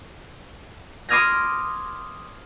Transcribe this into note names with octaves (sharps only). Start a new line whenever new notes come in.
C6 D6 D#6 F6 G#6 A#6